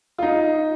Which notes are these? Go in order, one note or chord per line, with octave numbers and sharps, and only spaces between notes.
F4
D#4